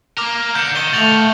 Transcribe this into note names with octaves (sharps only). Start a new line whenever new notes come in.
A#3 A#4 D6 F6
D3 G6 C#7
D#3 G7
A3 F#4 F5 A6 F7 F#7